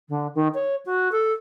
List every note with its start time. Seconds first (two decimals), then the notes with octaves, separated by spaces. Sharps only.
0.08 D3
0.34 D#3
0.54 C#5
0.85 F#4
1.11 A4